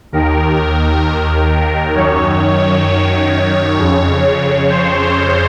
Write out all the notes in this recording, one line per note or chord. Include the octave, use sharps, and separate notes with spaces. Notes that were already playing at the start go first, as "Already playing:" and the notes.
D#2 D#3 A#4
F#2 D#3 C#5
C#5
C#5
C#5
F2 C#3
C5
C5